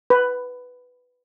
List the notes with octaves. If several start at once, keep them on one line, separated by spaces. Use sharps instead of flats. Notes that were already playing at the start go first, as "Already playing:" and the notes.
B4